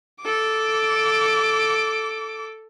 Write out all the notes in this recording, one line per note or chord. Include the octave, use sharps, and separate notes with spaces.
A4 D6